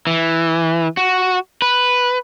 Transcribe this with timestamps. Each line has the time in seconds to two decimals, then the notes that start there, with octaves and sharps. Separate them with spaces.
0.07 E3
0.97 F#4
1.62 B4